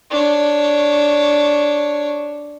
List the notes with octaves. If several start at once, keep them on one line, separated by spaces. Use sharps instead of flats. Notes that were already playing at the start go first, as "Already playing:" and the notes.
D4 C#5